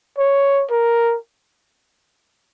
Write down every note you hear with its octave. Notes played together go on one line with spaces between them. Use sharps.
C#5
A#4